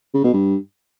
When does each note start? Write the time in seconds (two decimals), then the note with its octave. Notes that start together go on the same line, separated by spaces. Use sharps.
0.14 C#3
0.24 B2
0.33 G2